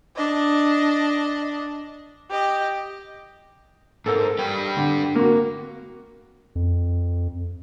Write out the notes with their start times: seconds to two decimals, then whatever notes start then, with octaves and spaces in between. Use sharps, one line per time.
0.16 D4 D#5
2.30 G4 D#5
4.06 G#2 A4 A#4
4.39 G2 G4
4.77 D3
5.15 A#3 F#4
6.55 F2